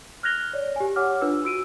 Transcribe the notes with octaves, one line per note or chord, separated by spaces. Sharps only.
F6 F#6 G#6 A#6 F7 G7
C#5 D5
G4 G#5
G4 C#5 F#5 D6 F6
D4 F4 B4 E6
F#4 E6 D7 D#7